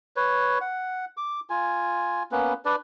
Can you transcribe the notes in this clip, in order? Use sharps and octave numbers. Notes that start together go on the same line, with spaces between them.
B4 C#5
F#5
D6
F4 G#5
A#3 B3 C#4 B4
D4 B4 D5